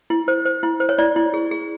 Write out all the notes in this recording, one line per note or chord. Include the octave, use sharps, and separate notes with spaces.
E4
C5
C5
E4
C5
C#5
E4 D5
E4
G#4
G#4